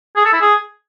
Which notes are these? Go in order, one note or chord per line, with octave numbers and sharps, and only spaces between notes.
G#4
A4
E4
G#4